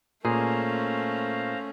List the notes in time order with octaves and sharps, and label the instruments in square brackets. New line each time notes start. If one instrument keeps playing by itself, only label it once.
[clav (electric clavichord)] A#2 G#4 [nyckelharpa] A3 C#4 [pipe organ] C5 F5 A#5